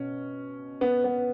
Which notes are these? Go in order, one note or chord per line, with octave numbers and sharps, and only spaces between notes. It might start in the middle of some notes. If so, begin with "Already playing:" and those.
Already playing: B2 C#4
B3
B3